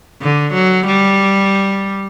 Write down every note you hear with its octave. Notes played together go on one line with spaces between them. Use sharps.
D3
F#3
G3